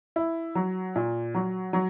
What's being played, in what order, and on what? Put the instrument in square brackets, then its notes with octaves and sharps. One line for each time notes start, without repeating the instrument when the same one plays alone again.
[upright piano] E4
F#3
A#2
F#3
F#3